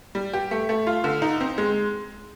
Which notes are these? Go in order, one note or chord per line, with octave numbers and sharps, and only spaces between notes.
G3
G4
A3
A3
F4
D3
D#4
C4
G#3